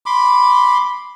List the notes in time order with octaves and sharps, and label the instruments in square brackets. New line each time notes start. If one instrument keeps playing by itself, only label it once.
[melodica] B5 C6 D6